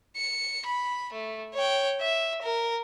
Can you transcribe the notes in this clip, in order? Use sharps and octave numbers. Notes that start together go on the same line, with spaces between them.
C#7
B5
A3
C#5 G5
E5
A#4